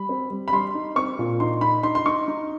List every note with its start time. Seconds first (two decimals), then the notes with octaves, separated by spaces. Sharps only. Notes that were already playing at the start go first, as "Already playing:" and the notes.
Already playing: G3 B5
0.09 C4
0.30 G3
0.48 B5
0.52 G3 C6
0.75 D#4
0.96 C4 C#6
1.19 A#2
1.40 D#4 C6
1.61 D#4 B5
1.83 D#4 C6
1.95 C6
2.06 D#4 C#6
2.28 D#4